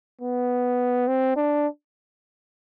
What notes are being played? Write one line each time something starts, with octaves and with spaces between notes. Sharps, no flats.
B3
C4
D4